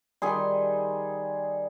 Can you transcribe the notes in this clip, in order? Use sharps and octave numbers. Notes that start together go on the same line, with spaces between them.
D#3 G3 G#4 C6